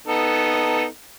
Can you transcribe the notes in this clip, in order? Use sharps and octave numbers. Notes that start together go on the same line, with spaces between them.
B3 D#4 A4